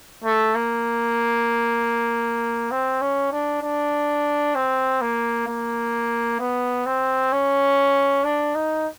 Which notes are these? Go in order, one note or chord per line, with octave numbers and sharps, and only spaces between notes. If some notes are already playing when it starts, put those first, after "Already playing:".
A3
A#3
C4
C#4
D4
D4
C4
A#3
A#3
B3
C4
C#4
D4
D#4